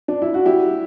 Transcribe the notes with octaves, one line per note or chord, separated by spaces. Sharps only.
D4
E4
F#4
E4 G4